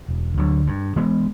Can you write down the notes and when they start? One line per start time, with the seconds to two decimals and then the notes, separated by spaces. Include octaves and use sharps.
0.08 E1
0.37 D2 D3 F#3
0.67 G2
0.96 E3 G#3 B3